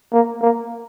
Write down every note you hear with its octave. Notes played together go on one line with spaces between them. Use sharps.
A#3
A#3